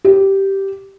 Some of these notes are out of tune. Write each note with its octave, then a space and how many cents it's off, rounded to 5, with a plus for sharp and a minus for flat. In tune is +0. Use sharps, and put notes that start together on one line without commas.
G4 -10